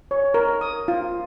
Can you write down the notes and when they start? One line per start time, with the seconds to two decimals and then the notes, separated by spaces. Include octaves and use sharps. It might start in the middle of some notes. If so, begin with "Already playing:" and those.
0.11 C#5
0.34 A#4
0.61 D#6
0.88 F4